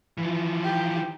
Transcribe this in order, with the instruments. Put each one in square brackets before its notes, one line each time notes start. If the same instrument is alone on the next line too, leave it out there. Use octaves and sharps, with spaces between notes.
[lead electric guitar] E3 F3
[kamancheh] D#4 G4